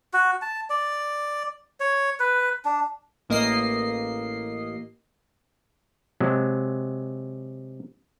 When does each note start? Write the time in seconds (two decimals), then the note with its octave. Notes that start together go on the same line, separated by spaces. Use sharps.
0.13 F#4
0.42 A5
0.70 D5
1.80 C#5
2.20 B4
2.65 D4
3.29 A1 A#3 D#5 C7
6.20 C3 F#3 G#3